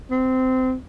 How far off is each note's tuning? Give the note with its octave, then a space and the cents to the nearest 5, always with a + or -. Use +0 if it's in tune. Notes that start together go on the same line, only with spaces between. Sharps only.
C4 -20